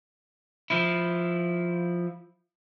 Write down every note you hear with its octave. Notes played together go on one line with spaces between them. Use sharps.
F3 E4